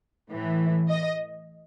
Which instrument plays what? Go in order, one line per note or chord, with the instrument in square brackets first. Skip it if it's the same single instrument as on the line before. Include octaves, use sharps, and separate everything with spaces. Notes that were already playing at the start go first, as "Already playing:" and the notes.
[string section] A2 E3
D#5